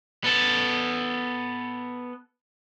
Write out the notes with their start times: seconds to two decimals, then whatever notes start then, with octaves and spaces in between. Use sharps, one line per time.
0.24 B3 A4